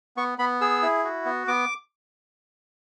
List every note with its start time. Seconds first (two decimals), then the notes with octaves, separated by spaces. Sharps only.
0.17 B3 C#6
0.38 B3 B5
0.61 G#4 E6
0.82 E4
1.04 F#4
1.25 B3
1.47 B3 D6